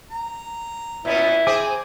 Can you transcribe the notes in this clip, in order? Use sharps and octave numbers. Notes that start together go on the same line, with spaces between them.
A#5
A#2 B3 C#4 E4
C4 G#4 C5 G#5 D6